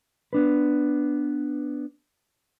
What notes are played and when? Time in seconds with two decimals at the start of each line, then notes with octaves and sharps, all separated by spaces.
0.33 B3 D4 B4